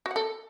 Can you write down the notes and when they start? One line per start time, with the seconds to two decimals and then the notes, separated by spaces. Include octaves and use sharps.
0.06 F#4
0.11 F#5
0.16 A4